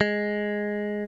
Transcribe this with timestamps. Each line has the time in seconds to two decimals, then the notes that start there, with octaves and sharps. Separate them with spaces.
0.01 G#3